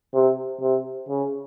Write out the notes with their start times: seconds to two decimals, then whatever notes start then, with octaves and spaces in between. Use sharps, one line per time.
0.14 C3
0.61 C3
1.09 C#3